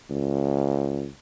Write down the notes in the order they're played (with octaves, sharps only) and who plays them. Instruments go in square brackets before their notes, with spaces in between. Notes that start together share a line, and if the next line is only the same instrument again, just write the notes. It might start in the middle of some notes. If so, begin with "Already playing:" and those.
[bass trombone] C#2